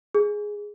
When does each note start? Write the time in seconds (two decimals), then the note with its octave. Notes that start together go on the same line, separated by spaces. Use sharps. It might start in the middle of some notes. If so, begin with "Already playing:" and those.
0.15 G#4